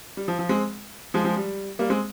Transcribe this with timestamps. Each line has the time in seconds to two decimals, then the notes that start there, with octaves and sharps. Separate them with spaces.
0.17 G3
0.28 F3
0.39 F3
0.49 G#3 C4
1.14 F3 G#3
1.25 F3 G#3
1.37 G3
1.79 G3 A#3
1.90 G#3 C4